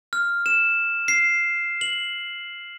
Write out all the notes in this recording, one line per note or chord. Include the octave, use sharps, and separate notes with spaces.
F6
E7
C7
F#7